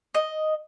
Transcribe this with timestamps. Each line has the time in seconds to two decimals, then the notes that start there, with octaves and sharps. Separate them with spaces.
0.14 D#5